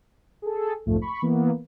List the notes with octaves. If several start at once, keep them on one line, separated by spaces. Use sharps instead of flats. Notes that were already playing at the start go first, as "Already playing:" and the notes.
G#4 A4
B1 F2 G#2 F3 A3
B5 C#6
E3 A#3 B3